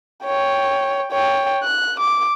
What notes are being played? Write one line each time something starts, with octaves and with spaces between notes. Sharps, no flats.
C#5 G5
C#5 G5
F#6
D6